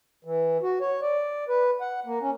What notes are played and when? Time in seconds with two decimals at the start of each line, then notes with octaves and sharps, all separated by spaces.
0.25 E3
0.62 F#4
0.81 C#5
1.01 D5
1.49 B4
1.81 F#5
2.06 A#3
2.21 C#4